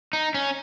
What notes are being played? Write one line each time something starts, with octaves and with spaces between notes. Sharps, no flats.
D#4
C#4